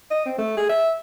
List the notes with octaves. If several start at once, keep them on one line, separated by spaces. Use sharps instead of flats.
D#5
C4
A3
G#4
E5